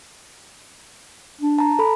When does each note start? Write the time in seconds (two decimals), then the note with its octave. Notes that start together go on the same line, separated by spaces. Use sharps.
1.41 D4
1.58 A5 A#5
1.79 A4 B5